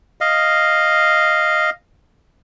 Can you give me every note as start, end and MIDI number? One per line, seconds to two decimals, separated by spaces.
0.21 1.70 75
0.21 1.70 77